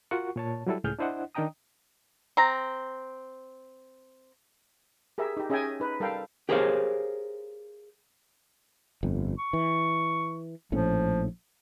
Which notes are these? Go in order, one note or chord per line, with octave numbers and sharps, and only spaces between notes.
F4 F#4 A#4 F#5 C#6
A#2 C#5 A5
F#3 G3 E4 A4
C#2 A2 G#4 F6 G6
D4 E4 C5 D#5 F#5
D#3 D4 D#5 G5 A#5 D#6
C4 A#5
G4 G#4 A#4 E5
D#4 G4
C#4 G#4 D#5 E5 G5 G#5
D#4 B4
G3 A4 A#4 F5 G5
G4 G#4 A#4 C5 C#5 F5
G1 F2
C#6
E3
A#1 A2 F3 C#4